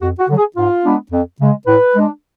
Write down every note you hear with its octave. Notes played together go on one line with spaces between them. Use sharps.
F2 F#4
F#4
D3 F#3
G#4
G#2 F4
G#3 B3 D4
F2
C#3 G#3
A2 B4
G#3 D4